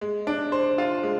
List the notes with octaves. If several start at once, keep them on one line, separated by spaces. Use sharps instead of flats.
G#3
D4
C5
F4
G#3